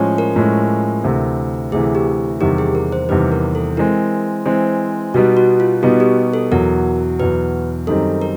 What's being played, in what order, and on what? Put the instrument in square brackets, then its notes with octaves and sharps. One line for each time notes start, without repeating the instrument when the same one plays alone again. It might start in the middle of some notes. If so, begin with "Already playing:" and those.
Already playing: [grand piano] A2 F3 G#3 C#4
[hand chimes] A#4
[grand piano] A2 F3 G#3 C#4
D2 C3 E3
[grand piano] D2 C3 E3 [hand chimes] G#4
[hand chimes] G4
[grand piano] E2 C3 D#3 G3 [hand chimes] G4
[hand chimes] G#4
A#4
C5
[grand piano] E2 C3 D#3 G3 [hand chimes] B4
[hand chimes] A#4
A4
[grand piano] E3 G#3 C4 [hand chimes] A#4
[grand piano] E3 G#3 C4 [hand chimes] C5
[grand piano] B2 G3 B3 D#4 [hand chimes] F#4
[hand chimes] F#4
F4
[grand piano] B2 G3 B3 D#4 [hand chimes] F#4
[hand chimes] G4
A4
[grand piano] E2 B2 F#3 [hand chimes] A#4
[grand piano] E2 B2 F#3 [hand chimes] B4
[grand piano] F#2 D#3 G3 C4 D#4 [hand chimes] A4
[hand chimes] A#4